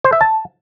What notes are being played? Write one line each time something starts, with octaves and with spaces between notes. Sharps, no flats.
C5
E5
A5